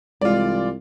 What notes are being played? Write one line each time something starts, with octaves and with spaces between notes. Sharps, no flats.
C2 E3 G#3 F4 D5